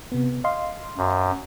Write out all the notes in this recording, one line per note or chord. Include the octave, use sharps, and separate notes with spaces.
C3 B3
D#5 F5 C6
F#2